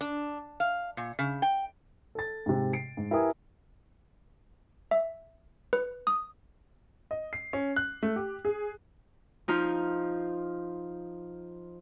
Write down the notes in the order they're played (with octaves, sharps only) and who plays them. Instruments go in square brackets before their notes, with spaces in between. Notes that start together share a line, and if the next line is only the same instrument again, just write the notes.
[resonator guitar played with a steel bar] D4
F5
A#2
C#3
G5
[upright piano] A4 A6
G#2 C3
C7 D7
G#2
E4 G4 A#4 B4 G#5 D#6
[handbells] E5
B4
D#6
[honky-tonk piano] D#5
C7
C#4
F#6
A3
G4
G#4
[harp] F3 D#4 F4